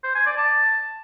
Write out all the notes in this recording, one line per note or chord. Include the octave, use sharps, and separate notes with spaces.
C5
G#5
D5
A5